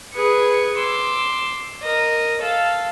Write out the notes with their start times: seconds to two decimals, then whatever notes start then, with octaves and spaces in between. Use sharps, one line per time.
0.15 G#4 B4 G#6 C#7
0.77 C6 D6 E6
1.83 A#4 D#5
2.42 A4 F5